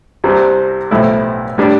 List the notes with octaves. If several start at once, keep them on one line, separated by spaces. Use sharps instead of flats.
C2 C3 G3 C4
B1 A2 F3 A3 E4
A2 G3 D4